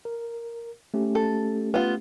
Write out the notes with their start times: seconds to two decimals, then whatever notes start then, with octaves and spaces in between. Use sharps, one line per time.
0.05 A#4
0.94 A3 C#4 G4
1.15 A4
1.74 B3 F4